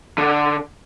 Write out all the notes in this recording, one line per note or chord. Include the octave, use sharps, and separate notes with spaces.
D3